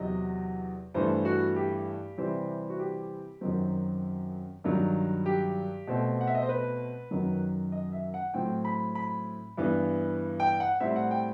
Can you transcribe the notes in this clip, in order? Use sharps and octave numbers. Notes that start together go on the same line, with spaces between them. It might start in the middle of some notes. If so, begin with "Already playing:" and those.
Already playing: E2 C3 F#3 D#5
G2 E3 A3 C5
F#4
G4
C3 E3 G3 C4
F#4
G4
F#2 D#3 F#3 C4
G2 D#3 F#3
G4
B2 A3 C4
F#5
E5
D#5
C5
B4
F#2 D#3 F#3
D#5
E5
F#5
A2 F#3 C4 G5
B5
B5
G2 E3 B3
G5
F#5
A2 G3 C4 E5
F#5
G5